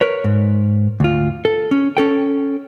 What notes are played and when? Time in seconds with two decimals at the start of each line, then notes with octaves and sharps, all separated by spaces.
0.01 A#4 B4 C#5
0.24 G#2
1.00 D2 F4
1.45 A4
1.71 C#4
1.97 C#4 A4 G5